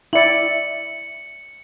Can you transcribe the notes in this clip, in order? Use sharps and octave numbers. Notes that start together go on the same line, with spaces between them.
E4 D5 C#7 F#7